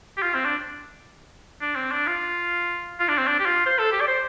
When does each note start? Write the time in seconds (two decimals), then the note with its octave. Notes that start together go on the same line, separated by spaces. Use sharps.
0.17 G4
0.22 F4
0.34 C4
0.45 D4
1.61 D4
1.76 C4
1.92 D4
2.07 F4
2.99 F4
3.08 D4
3.18 C4
3.27 D4
3.39 G4
3.46 F4
3.66 C5
3.79 A4
3.92 G4
4.01 D5
4.07 C5